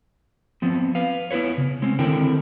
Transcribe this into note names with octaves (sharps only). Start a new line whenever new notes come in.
F3 B3 C4
B4 F5
B3 E4 F4 B4 C#5
C#3
G#3 C4 C#4
D3 D#3 C4 E4 A#4 G5